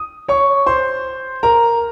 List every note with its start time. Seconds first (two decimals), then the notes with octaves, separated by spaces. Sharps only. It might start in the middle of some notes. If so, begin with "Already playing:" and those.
Already playing: D#6
0.28 C#5 C#6
0.66 C5 C6
1.43 A#4 A#5